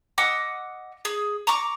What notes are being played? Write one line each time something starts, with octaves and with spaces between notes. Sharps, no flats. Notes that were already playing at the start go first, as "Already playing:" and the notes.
D#5 F#5 D6 E6
G#4
A#5 C#6 D6